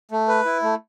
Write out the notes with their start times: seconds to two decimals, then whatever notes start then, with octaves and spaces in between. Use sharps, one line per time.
0.11 A3
0.28 B4
0.45 E4
0.62 A3